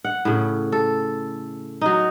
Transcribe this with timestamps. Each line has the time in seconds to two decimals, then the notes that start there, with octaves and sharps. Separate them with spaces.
0.04 F#5
0.25 A2 C#3
0.72 A4
1.81 F#3 D#4